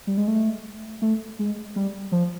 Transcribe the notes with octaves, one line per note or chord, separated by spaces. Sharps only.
G3
G#3
A3
A3
G#3
G3
F3